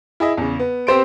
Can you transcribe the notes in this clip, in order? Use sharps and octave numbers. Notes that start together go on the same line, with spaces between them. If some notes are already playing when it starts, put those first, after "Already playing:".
E4 G#4 D#5 E5
E2 C#3
B3
B3 C4 G4 C5 C6 D7